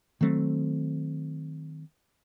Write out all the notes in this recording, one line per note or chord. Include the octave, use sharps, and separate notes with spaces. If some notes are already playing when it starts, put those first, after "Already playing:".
D#3 F#3 A3 C4